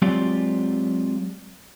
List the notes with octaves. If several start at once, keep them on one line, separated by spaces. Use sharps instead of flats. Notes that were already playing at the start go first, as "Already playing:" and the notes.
F#3 G#3 C4 F4 G4 D5